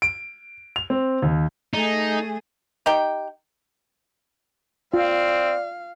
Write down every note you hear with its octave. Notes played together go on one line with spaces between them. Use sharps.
D7
F7
C4
D#2
A3 D#4 G#4
D#4 G4 G5
C4 F4 D5 F5